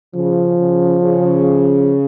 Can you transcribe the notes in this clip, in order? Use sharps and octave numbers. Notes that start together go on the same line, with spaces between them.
C#3 F3
C#3
C#3